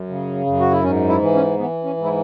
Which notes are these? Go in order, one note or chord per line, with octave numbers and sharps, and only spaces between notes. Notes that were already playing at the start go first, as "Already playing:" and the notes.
Already playing: F#2
C#3
F#2
F#4
E4
G#2 C#4
E4
E3
C#4
E3 B3
C#4
G#2
E4